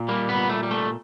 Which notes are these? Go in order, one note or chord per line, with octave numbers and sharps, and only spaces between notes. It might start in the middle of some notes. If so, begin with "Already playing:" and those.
Already playing: A#2
G3 A#3
B3
A#2
A3
G3
A3